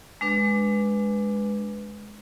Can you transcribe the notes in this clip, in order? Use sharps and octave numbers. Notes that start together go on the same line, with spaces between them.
G#3 D4 B4